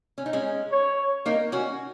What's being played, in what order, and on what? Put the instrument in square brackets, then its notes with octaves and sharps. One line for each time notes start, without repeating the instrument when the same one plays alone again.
[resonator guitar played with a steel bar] C#4
D#4
G#3 C#4
[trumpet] C#5
[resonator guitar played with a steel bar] A#3 D#4
C#4 F#4